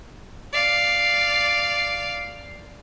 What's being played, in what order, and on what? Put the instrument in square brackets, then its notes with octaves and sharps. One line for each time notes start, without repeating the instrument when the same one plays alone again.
[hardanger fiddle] D5 F5